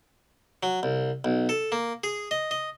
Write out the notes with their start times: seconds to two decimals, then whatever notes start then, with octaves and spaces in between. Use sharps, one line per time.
0.63 F#3
0.83 C2
1.25 B1
1.49 A4
1.72 A#3
2.04 G#4
2.31 D#5
2.51 D#5